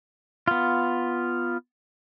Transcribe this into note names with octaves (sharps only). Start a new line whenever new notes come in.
B3 F4